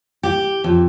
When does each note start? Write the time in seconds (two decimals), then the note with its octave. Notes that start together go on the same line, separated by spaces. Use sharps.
0.23 G4
0.64 F2